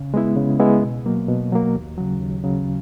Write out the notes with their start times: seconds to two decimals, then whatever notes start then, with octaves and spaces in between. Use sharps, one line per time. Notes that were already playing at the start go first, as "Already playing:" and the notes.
Already playing: C#3
0.14 G#3 B3 E4
0.37 C#3
0.60 G#3 B3 E4
0.82 B2
1.06 F#3 A#3
1.28 B2
1.52 F#3 A#3
1.75 D#2
1.98 C#3 F#3
2.20 D#2
2.44 C#3 F#3